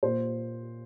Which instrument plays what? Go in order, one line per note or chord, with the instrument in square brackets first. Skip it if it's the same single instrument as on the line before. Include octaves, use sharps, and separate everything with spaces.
[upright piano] A#2 C5